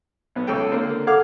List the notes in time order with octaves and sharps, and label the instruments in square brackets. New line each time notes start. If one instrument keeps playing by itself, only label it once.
[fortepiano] B1 B3
C#2 A4 G5
D3 A#3 C4
[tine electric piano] A4 F#5 G#6 [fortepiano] F5 D6 F6